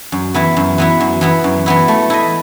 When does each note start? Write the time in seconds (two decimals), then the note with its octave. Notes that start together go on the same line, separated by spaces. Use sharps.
0.12 F#2
0.34 E3 B3 E4
0.57 F#2
0.78 E3 B3 E4
1.00 F#2
1.21 E3 B3 E4
1.44 F#2
1.66 E3 B3 E4
1.88 A3
2.10 E4 A4 D#5